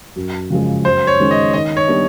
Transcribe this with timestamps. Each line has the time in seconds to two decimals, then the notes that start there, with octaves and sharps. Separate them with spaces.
0.16 F#2
0.50 C#3 F3 G#3
0.85 F#2 C5
1.07 C#5
1.18 D#3 G#3 C#4
1.31 D#5
1.53 D#3 D#5
1.77 C#5
1.88 G3 B3 D4